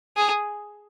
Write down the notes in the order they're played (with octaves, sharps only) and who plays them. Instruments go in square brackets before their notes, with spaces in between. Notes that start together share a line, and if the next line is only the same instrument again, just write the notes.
[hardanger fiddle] G#4